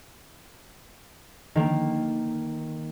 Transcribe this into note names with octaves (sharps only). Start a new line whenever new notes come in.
D#3 A#3